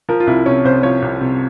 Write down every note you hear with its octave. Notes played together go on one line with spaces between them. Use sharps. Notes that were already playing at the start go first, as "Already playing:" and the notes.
F3 A#4
F4
C2 E4
C3 C#4
C2 C5
F3 C#5
C2
C3